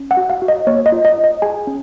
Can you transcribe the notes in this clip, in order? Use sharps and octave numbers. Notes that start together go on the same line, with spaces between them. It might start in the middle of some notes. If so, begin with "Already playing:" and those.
Already playing: C#4
F#5
F#4
F5
F#4
D#5
A#3 C#5
D#5
F4
D#5
F4
D#5
G#4 G#5
C#4